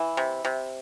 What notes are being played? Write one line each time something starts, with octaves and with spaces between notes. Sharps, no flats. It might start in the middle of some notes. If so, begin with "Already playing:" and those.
Already playing: E3 E4
C3
C3